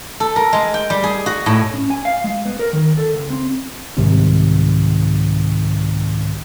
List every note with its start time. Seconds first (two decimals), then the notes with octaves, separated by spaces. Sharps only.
0.20 A4
0.36 A#4
0.53 G#3
0.74 G5
0.90 G3
1.03 G#4
1.26 F#4
1.46 A2
1.74 C#4
1.90 G#5
2.05 F5
2.24 G#3
2.46 B3
2.59 A#4
2.73 D#3
2.97 A4
3.13 C#2
3.30 C4
3.97 C2 G#2 C3 D#3